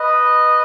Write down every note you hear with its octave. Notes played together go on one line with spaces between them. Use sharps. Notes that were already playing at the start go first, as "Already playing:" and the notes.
Already playing: B4 D#5